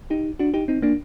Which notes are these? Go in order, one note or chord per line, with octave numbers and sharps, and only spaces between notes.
D#4 G4
D4 F#4
D#4 G4
C4 D#4
A#3 D4